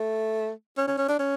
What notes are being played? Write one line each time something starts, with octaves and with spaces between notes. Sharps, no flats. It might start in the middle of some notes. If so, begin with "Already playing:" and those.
Already playing: A3
C#4
C#4
C#4
D4
C#4